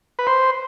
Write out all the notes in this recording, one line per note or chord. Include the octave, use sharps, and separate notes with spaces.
B4
C5